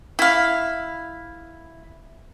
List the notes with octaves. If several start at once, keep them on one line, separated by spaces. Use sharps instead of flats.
E4 F5